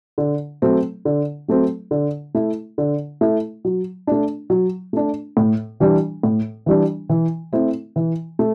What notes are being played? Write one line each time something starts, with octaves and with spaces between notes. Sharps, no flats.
D3
F#3 A3 C4
D3
F#3 A3 C4
D3
A3 E4
D3
A3 E4
F#3
A3 D4
F#3
A3 D4
A2
E3 G3 D4
A2
E3 G3 D4
E3
A3 C4 E4
E3
A3